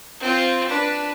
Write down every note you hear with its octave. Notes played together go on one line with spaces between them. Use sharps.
C4 F4
D4 B4